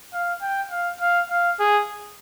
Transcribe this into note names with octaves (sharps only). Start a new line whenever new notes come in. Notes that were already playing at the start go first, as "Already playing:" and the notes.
F5
G5
F5
F5
F5
G#4